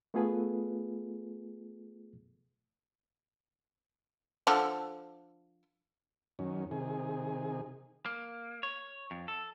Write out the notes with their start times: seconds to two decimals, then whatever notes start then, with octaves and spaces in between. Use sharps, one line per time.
0.14 A3 B3 F4 G#4 A4 B4
4.47 D3 F3 A4
6.39 F#2 D#3 C#4
6.71 C3 D#3 G#4
8.06 A#3
8.63 C#5
9.11 F2
9.28 A4